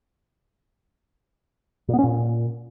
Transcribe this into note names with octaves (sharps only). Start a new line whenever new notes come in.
A#2
B3
C#4
A#2